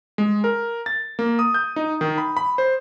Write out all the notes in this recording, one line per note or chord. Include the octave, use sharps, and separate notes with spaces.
G#3
A#4
A6
A#3
D#6
G6
D#4
D#3
B5
B5
C5